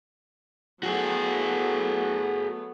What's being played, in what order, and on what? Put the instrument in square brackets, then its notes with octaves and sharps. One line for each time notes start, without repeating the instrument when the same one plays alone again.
[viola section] F#3 A3 B3 [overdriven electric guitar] F#4 G#4